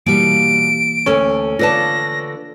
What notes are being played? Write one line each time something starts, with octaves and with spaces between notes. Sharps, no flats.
B2 E3 G3 A#3 D7
D2 C#4 A4
D3 F4 B4 D5 A5 A#6